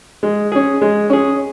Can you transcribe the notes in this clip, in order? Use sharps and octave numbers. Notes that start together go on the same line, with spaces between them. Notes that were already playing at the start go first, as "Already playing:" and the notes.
G#3
C#4 G#4
G#3
C#4 G#4